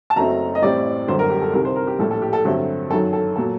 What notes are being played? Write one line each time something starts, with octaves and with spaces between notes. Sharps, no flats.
A5
F#1 F#2 F#3 A3 C4 A#5
D#5
A1 A2 G3 C4 D5
G1 F#2 D3 C5
A#4
G4
A4
C2 C3 D#3 G3 A#4
C5
A#4
G4
A#1 A2 G3 A4
A4
G4
A4
G2 D3 F#3 A3 C4
F#2 D#3 F#3 A4
A4
A#2 F#3 A4